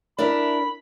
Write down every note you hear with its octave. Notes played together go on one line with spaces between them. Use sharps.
D4 E4 A#4 B5